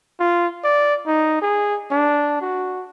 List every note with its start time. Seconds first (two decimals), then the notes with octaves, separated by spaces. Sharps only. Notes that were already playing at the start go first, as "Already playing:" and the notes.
0.20 F4
0.64 D5
1.07 D#4
1.42 G#4
1.91 D4
2.41 F#4